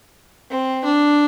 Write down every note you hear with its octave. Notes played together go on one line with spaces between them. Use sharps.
C4
D4